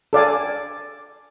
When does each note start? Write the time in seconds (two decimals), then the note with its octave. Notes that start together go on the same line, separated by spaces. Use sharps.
0.13 A4 D5 F5 G#5